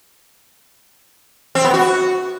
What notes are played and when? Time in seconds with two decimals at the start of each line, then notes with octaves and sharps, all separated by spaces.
1.55 C4
1.64 B3
1.74 F#4